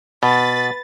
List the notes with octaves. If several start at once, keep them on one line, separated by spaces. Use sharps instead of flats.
B2 B4 A6